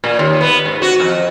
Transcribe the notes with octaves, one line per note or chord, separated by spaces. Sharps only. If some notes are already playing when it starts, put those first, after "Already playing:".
A#2
D#2
B3
G#2
F#4
F2